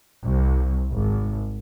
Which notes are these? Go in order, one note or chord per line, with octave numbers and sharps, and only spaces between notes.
C2
G#1